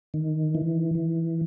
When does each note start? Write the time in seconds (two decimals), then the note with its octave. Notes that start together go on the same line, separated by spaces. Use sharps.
0.14 D#3
0.55 E3
0.95 E3